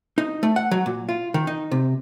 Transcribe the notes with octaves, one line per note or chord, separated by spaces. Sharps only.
D#4
A3
F#5
F#3
A#2
F4
D#3
D#4
C3